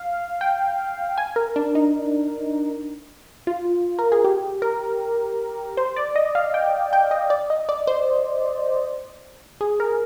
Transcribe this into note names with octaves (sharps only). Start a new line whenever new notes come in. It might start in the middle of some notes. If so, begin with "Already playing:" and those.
Already playing: F5
G5
G#5
A#4
D4
D#4
F4
A#4
G#4
G4
A#4
C5
D5
D#5
F5
G5
G5
D#5
D5
D#5
D5
C5
G#4
A#4